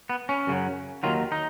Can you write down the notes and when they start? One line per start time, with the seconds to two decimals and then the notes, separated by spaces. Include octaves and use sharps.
0.10 B3
0.29 C#4
0.47 F#2 C#3 F#3
1.03 D#2 D#3 F#3 F4
1.32 D#4